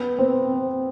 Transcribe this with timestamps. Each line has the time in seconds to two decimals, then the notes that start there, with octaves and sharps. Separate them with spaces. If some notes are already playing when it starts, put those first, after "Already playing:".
Already playing: B3
0.19 C4